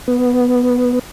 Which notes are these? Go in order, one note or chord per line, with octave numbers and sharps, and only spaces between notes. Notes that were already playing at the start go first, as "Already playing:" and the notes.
B3